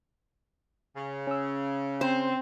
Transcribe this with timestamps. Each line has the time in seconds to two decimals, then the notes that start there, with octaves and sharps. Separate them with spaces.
0.96 C#3
1.27 C#4 E6
2.01 C4 C5